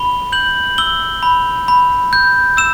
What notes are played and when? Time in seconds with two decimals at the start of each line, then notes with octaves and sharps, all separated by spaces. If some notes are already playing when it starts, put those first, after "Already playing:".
Already playing: B5 G7
0.32 G6 F#7
0.78 E6 G7
1.23 B5
1.68 B5
2.13 G6
2.57 E6 E7